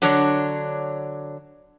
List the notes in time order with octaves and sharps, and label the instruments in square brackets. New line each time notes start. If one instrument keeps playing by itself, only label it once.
[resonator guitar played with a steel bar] D3 F#3 D4 C#5